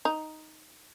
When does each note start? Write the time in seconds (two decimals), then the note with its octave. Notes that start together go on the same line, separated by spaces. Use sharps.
0.05 D#4